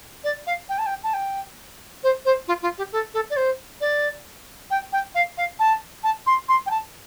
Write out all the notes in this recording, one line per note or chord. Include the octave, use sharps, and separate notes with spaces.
D5
F5
G5
A5
G5
A5
G5
C5
C5
F4
F4
G4
A4
A4
D5
C5
D5
G5
G5
F5
F5
A5
A5
C6
C6
G5
A5